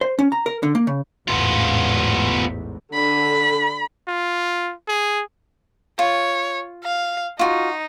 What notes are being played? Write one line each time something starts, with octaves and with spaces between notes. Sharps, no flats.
C5
C#4
A#5
A#4
D3
A#3
C#3
A1 E2 G#2 B3 F4
D3 B5
F4
G#4
F4 C#5
F5
D#4 F4 F#4